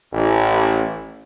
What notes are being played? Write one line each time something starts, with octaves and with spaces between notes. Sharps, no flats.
A1